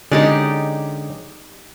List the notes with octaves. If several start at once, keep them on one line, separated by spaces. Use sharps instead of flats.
D3 G#3 C#4 D#4 G4 D5